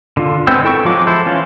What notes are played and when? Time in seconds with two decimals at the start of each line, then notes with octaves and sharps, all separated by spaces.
0.17 D3 F4
0.47 G#3 B3 C4 G5 E6
0.64 E4 A4 G5 C#6
0.85 F3 F#3 G#3 F4 D6
1.07 E4 A4 C5
1.26 E3 C#4 F4